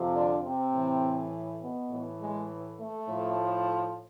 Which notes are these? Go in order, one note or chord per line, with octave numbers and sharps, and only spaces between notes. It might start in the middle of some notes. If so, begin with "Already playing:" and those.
Already playing: F2 C3 F3
D3 D4
C3 C4
A2 E3
B2 B3
A2 E3
G#3
A3
A2 F3